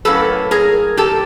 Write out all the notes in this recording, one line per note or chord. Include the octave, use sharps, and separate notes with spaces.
A2 F#3 A#3 C#4 A4 B4
G#4 A#4
G4 A4